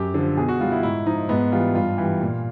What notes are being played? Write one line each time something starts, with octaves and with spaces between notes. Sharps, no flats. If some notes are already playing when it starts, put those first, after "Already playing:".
Already playing: F#2 G4
D3 F3
B2 G#4
F#4
G3 F4
E4
G#2 E4
F3 D#4
G#2 B3
E3 G3 F4
G2 F4
E3 G3
A#2